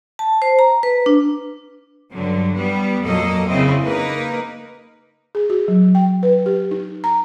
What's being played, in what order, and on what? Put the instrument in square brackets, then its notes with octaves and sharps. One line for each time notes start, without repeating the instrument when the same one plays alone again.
[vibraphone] A5
C5
A#5
B4
D4
[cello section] G2 D3 F#3
G3 B3
F2 A#2 F#3 A#3 A4 D#5
C#3 C4 E4 D#5
A#3 D#4 A#4 B4
[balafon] G#4
F#4
F#3
G5
B4
G4
D#4
A#5